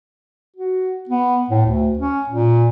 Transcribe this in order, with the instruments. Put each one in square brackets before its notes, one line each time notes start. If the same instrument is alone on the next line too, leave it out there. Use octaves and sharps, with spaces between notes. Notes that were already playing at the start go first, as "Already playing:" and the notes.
[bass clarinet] F#4
B3
A2
D2
C#4
A#2